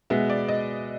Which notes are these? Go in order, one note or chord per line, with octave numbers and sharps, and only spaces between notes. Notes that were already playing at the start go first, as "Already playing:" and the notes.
B2 G#3 B3 E5
D5
D#5